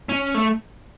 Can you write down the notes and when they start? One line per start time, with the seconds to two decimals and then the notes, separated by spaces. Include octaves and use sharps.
0.09 C#4
0.35 A3